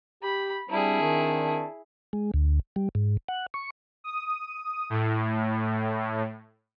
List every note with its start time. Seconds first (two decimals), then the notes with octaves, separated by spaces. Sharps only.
0.23 G4 B5
0.70 G3 C4 D4 E4 G#4 A5
1.00 D#3
2.13 G#3
2.34 D2
2.76 G3
2.95 G#2
3.28 F#5
3.54 C#6
4.04 D#6
4.90 A2